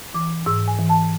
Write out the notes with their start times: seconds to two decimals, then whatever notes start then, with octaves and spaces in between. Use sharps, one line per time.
0.14 E3 D6
0.46 G#2 E6
0.68 G#5
0.78 E3
0.89 A5